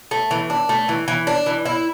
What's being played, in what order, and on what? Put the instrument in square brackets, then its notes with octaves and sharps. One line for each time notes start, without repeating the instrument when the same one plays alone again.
[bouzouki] A3
E3
D4
A3
E3
E3
D4
E3
E4